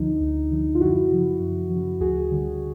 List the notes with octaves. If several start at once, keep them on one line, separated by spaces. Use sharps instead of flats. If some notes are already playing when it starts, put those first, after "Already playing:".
Already playing: D2 D3 F3 D#4
D2
D3 F3
F4
F#2 E4 F#4
C#3 F3
F#2
C#3 F3
D2 F#4 G#4
D3 G3